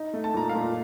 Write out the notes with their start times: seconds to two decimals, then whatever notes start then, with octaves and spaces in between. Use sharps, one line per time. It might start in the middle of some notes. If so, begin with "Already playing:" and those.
Already playing: D#4
0.14 A3
0.24 A5
0.34 A#2 A#5
0.49 F5 A5
0.55 A#2